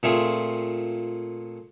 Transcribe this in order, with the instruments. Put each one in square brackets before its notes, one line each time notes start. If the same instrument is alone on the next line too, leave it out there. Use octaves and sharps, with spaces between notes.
[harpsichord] A#2 A3 C4 F4 G#4